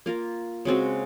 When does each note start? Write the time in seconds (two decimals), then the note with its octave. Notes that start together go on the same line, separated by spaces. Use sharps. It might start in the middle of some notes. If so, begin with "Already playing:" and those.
0.06 A#3 F4 A#4
0.65 C#3 G#3 C4 F#4